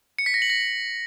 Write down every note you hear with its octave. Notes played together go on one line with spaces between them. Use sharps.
C#7
B6
A#6
F#7
A#6